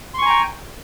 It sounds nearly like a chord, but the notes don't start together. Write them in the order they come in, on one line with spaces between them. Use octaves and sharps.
C6 C#6 G#5 A#5 G5